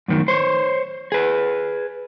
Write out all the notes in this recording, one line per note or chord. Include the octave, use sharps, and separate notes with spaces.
F#2 A2 D#3
C5 C#5
G#4 B4